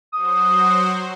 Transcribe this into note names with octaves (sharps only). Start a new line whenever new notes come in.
F#3 F#4 C5 D#6